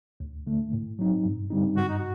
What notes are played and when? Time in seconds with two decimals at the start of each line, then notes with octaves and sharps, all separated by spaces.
0.20 D2
0.47 D3 A3
0.73 A2
0.99 F#3 C4 D#4
1.25 G2
1.50 D3 G3 C4 D#4
1.76 G2 F#4
1.88 D#4
1.99 F#4